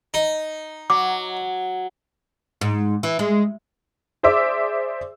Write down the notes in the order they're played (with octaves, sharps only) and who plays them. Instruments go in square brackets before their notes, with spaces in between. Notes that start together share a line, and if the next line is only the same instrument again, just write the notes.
[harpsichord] D#4
[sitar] F#3 [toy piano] D6
[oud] G#2
E3
G#3
[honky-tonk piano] G#4 C5 D5 E5 D6 E6